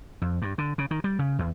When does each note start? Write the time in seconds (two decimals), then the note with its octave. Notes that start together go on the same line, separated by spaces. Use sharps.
0.22 F2
0.42 G2
0.58 D3
0.78 C#3
0.91 D#3
1.04 G3
1.19 C#3
1.39 E2